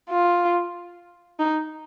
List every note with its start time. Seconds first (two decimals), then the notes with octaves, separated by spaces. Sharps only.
0.10 F4
1.39 D#4